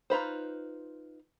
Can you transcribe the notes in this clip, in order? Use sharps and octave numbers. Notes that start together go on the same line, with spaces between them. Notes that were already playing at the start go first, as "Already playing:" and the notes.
D#4 F4 B4 C5